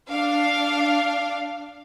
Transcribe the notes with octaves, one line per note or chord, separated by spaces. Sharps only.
D4 F5